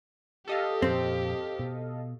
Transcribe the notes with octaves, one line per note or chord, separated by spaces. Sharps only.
G4 A4 D#5 F5
F2 A#2 C4 C5
B2